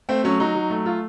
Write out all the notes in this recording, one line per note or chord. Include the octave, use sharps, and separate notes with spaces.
A3 C4
F#3 C#4
F#3 D#4
F#3
A3
F4